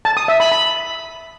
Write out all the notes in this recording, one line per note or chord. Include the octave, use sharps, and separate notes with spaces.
A5
D#6
E5
B5
B5